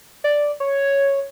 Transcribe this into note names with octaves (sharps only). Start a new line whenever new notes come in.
D5
C#5